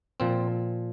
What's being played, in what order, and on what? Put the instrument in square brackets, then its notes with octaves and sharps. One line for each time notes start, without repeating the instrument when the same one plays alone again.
[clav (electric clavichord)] A#2 F3 C4